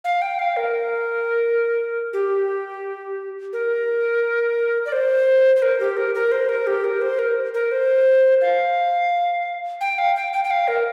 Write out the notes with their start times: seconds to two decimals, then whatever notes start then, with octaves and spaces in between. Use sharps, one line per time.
0.04 F5
0.22 G5
0.39 F5
0.57 A#4
2.13 G4
3.53 A#4
4.85 D5
4.92 C5
5.56 C5
5.62 A#4
5.80 G4
5.97 A#4
6.15 A#4
6.32 C5
6.49 A#4
6.67 G4
6.84 A#4
7.01 C5
7.19 A#4
7.54 A#4
7.71 C5
8.41 F5
9.81 G5
9.98 F5
10.16 G5
10.33 G5
10.44 G5
10.50 F5
10.68 A#4